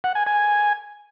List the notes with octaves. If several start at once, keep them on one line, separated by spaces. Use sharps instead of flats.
F#5
G#5
G#5